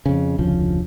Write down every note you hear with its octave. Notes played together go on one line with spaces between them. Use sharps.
F2 C#3
F1 D2 C#3 F3